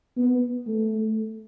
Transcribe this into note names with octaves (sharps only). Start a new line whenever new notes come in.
B3
A3